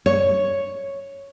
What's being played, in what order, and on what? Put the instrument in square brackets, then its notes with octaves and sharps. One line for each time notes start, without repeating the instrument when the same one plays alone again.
[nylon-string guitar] C#5